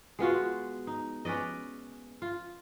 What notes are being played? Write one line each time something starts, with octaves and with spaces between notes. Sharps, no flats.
G#3 B3 F4 F#4
D#4
C#4 B4 D5 D#5
F4